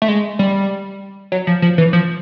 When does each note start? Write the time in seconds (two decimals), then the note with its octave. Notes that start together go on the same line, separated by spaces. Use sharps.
0.02 A3
0.08 G#3
0.39 G3
1.32 F#3
1.47 F3
1.62 F3
1.78 E3
1.93 F3